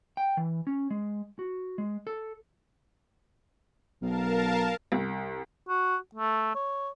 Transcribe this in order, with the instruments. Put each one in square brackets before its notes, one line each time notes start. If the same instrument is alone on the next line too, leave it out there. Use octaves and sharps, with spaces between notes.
[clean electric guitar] G5
E3
C#4
G#3
F#4
G#3
A4
[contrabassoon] B1 [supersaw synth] A#4 F5 A5
[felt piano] C2
[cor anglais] F#4
A3
C#5